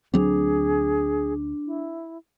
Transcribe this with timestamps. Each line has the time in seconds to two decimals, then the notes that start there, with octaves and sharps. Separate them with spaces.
0.14 D2 F#3 C4 D4 G#4
1.66 E4